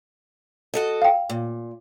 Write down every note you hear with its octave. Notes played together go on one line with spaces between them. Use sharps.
F#4 A4 D#5
F5 G5
A#2